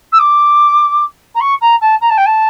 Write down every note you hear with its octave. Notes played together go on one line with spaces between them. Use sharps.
E6
D6
A#5
C#6
A#5
A5
A#5
A5
G5
A5